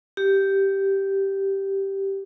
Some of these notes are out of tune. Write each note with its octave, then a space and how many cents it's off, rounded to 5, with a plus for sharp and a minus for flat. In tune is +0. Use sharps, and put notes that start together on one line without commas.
G4 -5